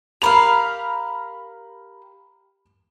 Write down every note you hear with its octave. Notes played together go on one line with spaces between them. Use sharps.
G4 A#4 F5 B5 F7